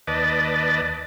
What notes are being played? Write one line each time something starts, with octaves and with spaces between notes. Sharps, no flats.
D#2 B4 D5 D#5 A5